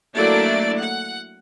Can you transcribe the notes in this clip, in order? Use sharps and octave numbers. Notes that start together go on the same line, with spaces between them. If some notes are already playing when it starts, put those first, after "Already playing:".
F#3 A3 A#3 D4 E4 D5
F#5